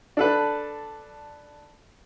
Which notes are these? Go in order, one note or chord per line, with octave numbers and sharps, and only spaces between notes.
D4 A4 B4